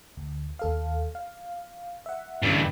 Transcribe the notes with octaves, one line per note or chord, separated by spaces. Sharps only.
D2
D#2 A4 F5
F5
E5 F#5
G2 D3 E3 C#4